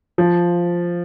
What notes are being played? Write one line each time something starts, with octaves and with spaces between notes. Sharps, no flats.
F3